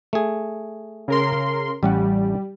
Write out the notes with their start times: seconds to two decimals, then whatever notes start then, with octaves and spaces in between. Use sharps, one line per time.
0.13 A3 G#4
1.08 C#3 A#4 C6
1.83 A1 G3 C#4 F#5